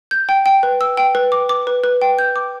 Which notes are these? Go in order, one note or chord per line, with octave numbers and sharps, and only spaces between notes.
G6
G5
G5
B4
E6
G5
B4
D6
D6
B4
B4
G5
G6
D6